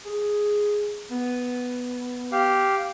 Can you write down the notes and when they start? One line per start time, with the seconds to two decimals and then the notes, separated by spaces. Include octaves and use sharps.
0.06 G#4
1.10 B3
2.32 G4 F5